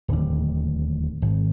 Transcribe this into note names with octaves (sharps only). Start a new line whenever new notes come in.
D1 D#2
G#1